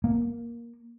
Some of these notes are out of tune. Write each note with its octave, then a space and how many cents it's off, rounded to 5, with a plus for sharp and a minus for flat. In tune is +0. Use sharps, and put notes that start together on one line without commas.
A#3 +10